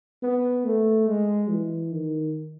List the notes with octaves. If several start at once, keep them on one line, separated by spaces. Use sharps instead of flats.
B3
A3
G#3
E3
D#3